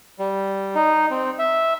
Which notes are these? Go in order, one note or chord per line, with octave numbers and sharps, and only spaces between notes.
G3
D#4
C4
E5